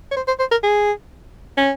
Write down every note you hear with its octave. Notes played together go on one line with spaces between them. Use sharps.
C#5
C5
C5
C5
A#4
G#4
C#4